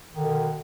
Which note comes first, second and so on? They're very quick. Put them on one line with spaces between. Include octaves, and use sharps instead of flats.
D#3 D3 B2